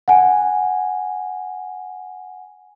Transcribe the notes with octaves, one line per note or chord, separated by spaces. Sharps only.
F#5 G#5